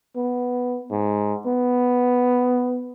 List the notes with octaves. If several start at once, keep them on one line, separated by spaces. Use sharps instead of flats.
B3
G#2
B3